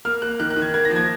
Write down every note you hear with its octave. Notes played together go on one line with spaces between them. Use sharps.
A#3 F6
A#3 F#6
D#3 F#6
F#6
D#3
G#6
A#3 G#6
A#6
F3
G#6